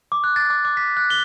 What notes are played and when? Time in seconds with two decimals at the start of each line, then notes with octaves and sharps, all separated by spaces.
0.12 D6
0.24 F#6
0.36 A6
0.50 D6
0.65 D6
0.77 B6
0.97 F#6
1.10 G7